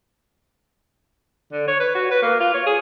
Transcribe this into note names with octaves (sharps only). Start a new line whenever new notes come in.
D3
C#5
B4
F#4
B4
A#3
F4
C#5
G#4